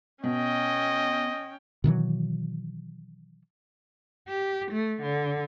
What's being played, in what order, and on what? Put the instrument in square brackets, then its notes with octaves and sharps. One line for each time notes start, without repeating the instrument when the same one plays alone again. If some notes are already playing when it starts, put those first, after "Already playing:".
[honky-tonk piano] B2 [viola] C#4 G5 [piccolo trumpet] D#5
[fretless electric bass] B2 D#3 E3 F#3
[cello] G4
A3
D3